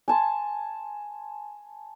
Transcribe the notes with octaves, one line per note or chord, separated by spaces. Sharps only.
G#5 A5 C6